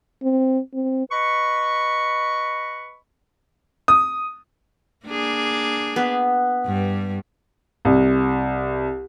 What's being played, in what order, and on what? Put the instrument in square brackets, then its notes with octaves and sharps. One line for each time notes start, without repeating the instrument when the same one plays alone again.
[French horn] C4
C4
[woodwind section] B4 D#5 B5 C#6
[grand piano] D#6
[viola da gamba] A#3 D4 G#4
[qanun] B3
[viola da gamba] G2 G3
[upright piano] C2